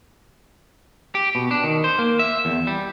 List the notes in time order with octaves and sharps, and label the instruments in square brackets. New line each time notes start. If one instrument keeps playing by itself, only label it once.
[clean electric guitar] G4
B2
D4
D#3
C5
A#3
E5
E2
G3